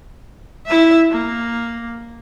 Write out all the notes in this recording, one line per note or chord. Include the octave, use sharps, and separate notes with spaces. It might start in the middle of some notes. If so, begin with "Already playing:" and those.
E4 E5
A#3